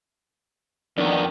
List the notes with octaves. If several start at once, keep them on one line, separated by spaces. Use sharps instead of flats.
F2 D#3 B3 D4